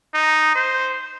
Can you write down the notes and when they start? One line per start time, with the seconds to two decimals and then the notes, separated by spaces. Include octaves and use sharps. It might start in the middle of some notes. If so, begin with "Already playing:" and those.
0.14 D#4
0.55 C5